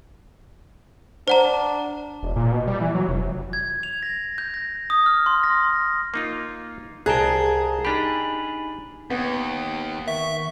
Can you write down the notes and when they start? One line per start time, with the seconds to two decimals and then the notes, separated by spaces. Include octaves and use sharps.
1.28 D4 C5 F#5 A#5
2.23 E1
2.36 A#2
2.52 B2
2.67 G3
2.81 E3
2.94 F#3
3.08 F1
3.53 G#6
3.83 F7
4.03 A#6
4.38 G6
4.54 A#6
4.90 D#6
5.06 F6
5.26 C6
5.44 A#6
5.72 F6
6.14 A#3 D#4 F4
7.06 C2 G#4 G5 A5 A#5 F#6
7.85 D4 D#4 G4 G#5 B5
9.10 D#2 B3
10.08 D#3 E5 C#6